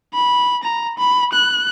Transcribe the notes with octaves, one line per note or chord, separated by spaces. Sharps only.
B5
A#5
B5
F#6